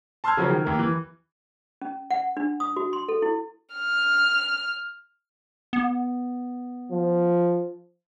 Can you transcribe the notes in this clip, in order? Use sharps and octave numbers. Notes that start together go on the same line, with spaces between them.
A5 C6 E6 F6 G6 G#6
C#3 F3 F#3 C#4 A#4 C5
D#3
D#2 A#4
E3
C#4
F#5
D4
D#6
F#4
C6
A4
E4
F6
B3
F3